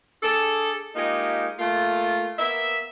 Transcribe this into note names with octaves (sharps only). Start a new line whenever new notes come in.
D4 G#4 A4
G#3 A#3 D#4 F4 G4
A3 A#3 F4
A#3 B3 E5